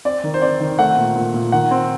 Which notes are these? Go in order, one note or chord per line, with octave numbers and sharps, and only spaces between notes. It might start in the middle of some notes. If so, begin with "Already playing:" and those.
C4 D5
D#3
C5
C4 D5
D#3
A3 F#5
A#2
A#2
A#2
D#3 F#5
C4